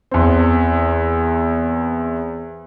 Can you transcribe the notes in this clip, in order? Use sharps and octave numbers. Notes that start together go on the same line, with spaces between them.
E2 C4